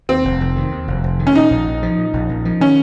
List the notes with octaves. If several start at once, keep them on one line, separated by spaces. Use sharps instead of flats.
D#2 C4
F1
F1
D#3
D#2
F1
F1
D#3
C#4
A#2 D#4
A#1
A#1
F3
A#2
A#1
A#1
F3
D#3 C#4